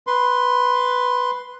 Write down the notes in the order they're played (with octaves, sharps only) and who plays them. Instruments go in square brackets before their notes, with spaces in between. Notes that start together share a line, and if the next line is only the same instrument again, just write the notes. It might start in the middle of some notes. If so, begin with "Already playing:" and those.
[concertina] B4 C6